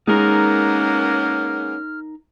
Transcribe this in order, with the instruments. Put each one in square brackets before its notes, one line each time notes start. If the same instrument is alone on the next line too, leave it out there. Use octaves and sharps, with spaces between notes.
[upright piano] G#3 [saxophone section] A#3 B3 C#4 [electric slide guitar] D#4 A#4 [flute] F6